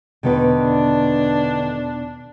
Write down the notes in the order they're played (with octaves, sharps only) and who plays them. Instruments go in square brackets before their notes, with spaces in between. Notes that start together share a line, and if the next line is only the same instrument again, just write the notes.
[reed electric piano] E2 B2 B3 [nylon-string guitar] D3 D#3 B4
[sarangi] D4